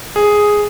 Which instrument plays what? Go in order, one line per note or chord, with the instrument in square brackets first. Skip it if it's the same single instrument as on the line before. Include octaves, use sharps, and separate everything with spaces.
[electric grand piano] G#4